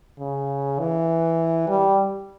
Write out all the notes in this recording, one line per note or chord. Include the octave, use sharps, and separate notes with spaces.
C#3
E3
G3